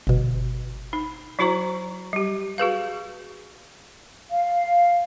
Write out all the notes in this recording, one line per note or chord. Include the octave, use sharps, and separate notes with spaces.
G1 B2
D#4
F#3 E4 F#4 C5 A#5 C#6
G3 G4
F#4 G#4 B4 F5
F5